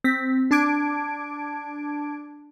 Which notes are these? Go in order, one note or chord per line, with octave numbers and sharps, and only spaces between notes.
C4 B6
D4 A5 D6 G#6 D7